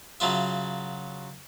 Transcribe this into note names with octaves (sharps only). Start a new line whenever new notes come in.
C#3 F#3 F4 E5